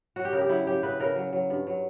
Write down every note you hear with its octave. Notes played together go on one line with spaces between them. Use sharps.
F#3 F#4
G4
C#3 A#4
G4
F#3 E4
F#3 G4
C#3 B4
C#3 A#4
F#3
F#3
G2
F#3